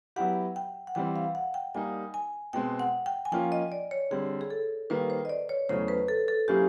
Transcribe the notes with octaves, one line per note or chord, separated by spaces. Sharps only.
F#3 B3 E4 G4 F#5
G5
F#5
E3 G3 C4 G5
F5
F#5
G5
G3 A#3 D#4 G#5
G#5
B2 G#3 C4 G5
F#5
G5
G#5
F3 A#3 C#4 F4 G5
D#5
D5
C#5
D3 G3 C4 G#4
G#4
A4
D#3 G3 A#3 B4
C5
D#5
D5
C#5
E2 C#3 F#3 A3 C#4 C5
B4
A4
A4
F#3 A#3 C#4 E4 G4 G#4